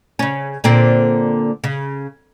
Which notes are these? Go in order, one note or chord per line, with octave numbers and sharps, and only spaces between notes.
C#3 C#4
A#2 D3 C4
C#3